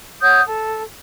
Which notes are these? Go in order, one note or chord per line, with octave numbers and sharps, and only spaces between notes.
C#5 F#5 D#6 G6
A4